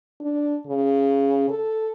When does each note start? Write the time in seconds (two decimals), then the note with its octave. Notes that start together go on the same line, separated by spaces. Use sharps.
0.20 D4
0.67 C#3
1.50 A4